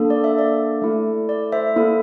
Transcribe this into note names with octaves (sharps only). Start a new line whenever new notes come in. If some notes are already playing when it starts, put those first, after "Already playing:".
Already playing: A#3 D4 A4
D5
E5
D5
A3 E4 A4
D5
C5 E5
A#3 E4 A4